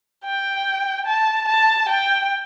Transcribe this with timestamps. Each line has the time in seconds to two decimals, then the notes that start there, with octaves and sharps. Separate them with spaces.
0.24 G5
1.06 A5
1.48 A5
1.89 G5